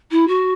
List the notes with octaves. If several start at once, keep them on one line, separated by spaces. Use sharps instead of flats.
E4
F#4